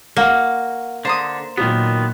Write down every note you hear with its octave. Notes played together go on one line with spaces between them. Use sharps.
A#3 F#4
D3 C5 A#5 D#6
A#2 D#3 F#3 B3